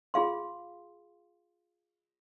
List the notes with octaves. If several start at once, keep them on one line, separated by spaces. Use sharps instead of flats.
F4 G#4 F5 C6